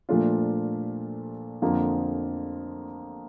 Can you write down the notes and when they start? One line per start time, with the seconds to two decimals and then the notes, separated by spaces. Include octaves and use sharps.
0.09 A#2 F3 A3 D4 F4
1.62 F2 D3 F3 A#3